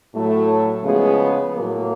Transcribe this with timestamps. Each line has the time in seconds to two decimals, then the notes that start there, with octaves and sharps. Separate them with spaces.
0.15 A2 F#3 A3
0.84 C#3 F3 G#3 B3 G#4
1.53 A2 F#3 A#3